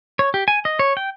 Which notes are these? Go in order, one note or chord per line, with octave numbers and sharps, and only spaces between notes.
C#5
G4
G#5
D#5
C#5
G5